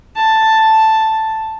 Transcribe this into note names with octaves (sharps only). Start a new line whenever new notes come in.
A5